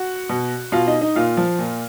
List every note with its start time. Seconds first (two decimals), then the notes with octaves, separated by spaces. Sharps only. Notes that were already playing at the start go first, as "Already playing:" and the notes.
Already playing: F#4 F#5
0.29 B2
0.72 B2 F4 F5
0.87 D#4 D#5
1.01 D#4 D#5
1.16 A#2 F4 F5
1.37 F3
1.59 A#2